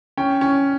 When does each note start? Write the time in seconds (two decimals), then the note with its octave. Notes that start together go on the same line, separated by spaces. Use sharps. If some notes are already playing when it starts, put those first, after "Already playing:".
0.17 C#4 G5
0.41 C#4